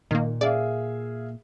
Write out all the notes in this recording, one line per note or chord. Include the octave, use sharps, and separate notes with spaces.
A#2 D#3 A#3
G#4 D5 E5 F5